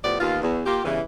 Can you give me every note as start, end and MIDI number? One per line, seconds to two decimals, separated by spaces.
0.04 0.17 45
0.04 0.17 53
0.04 0.17 59
0.04 0.17 67
0.04 0.17 74
0.20 0.41 39
0.20 0.41 59
0.20 0.41 65
0.42 0.60 40
0.66 0.82 58
0.66 0.82 65
0.66 0.82 67
0.84 1.00 40
0.84 1.00 43
0.84 1.00 49
0.84 1.00 52